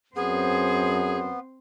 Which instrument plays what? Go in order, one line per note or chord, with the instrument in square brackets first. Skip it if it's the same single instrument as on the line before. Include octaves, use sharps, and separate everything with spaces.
[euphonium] F#2 [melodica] B3 [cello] C4 C5 [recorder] G#4